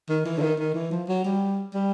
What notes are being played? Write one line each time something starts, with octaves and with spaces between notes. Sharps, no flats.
D#3
E3
D3
D#3
D#3
E3
F3
F#3
G3
G3